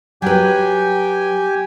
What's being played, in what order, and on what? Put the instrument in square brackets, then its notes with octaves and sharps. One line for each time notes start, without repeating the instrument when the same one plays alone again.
[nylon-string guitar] F#3 B4 [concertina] G4 G5 G#5